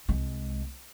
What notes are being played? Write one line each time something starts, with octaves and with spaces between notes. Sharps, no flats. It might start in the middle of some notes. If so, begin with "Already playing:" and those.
C2 G#3